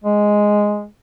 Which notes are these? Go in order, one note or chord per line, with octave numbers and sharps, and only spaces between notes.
G#3